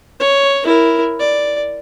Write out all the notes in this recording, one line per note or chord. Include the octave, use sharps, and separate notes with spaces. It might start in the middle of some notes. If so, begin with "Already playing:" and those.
C#5
E4 A#4
D5